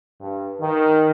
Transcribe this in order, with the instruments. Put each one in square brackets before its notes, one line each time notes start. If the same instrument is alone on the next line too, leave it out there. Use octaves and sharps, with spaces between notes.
[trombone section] G2
D#3